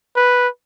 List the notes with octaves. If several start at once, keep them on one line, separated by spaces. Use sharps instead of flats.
B4